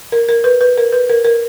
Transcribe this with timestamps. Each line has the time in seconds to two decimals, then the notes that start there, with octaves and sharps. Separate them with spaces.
0.12 A#4
0.29 A#4
0.44 B4
0.61 B4
0.77 A#4
0.92 B4
1.09 A#4
1.25 A#4